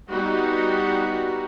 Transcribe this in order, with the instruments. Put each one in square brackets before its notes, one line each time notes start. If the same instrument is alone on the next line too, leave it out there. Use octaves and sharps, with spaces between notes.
[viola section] G3 B3 D#4 F#4